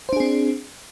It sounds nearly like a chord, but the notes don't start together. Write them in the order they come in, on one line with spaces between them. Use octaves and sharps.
C5 D4 G#4 C4